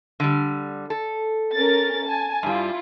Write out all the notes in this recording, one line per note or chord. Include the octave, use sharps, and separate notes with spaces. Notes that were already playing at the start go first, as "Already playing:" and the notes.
D3 G3
A4
C#4 A#4 A6
G#5 A5
G2 G3 E4 F4